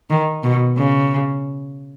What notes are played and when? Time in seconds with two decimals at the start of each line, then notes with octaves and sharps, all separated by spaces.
0.10 D#3
0.43 B2
0.77 C#3